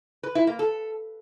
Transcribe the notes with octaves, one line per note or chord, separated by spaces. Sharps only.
B4
E4
A#3
A4